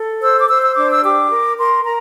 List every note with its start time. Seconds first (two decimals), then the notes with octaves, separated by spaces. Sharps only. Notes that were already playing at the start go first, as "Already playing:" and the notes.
Already playing: A4
0.21 C5 E6
0.40 D6
0.48 C5 E6
0.62 E6
0.75 D4 D6
0.89 E6
1.02 G4 D6
1.30 A#4
1.58 A#4 C6
1.84 A#4 A#5